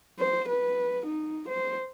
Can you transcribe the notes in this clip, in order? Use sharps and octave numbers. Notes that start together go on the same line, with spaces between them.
C5
B4
D#4
C5